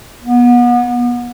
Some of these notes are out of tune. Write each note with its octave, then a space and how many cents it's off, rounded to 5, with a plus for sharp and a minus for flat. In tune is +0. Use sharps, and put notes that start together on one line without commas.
B3 -30